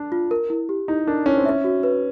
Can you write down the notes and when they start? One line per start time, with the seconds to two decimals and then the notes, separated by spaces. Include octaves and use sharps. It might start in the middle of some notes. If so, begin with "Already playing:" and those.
Already playing: D4
0.12 F4
0.31 A#4
0.50 E4
0.69 G4
0.88 D#4 E4
1.07 D4 A#4
1.26 C#4 E4
1.37 C4
1.45 C#4 E5
1.64 F#4
1.83 B4